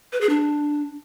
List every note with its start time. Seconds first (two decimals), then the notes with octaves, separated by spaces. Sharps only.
0.13 B4
0.21 G#4
0.29 D4